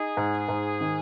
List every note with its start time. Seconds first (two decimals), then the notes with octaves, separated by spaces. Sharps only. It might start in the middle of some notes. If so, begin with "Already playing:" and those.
Already playing: D#4 G#4
0.17 G#2
0.49 G#2
0.81 D#3